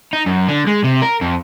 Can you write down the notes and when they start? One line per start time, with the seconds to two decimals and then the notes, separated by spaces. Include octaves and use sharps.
0.13 D#4
0.26 F#2
0.48 D3
0.67 G#3
0.84 C3
1.02 A#4
1.22 F2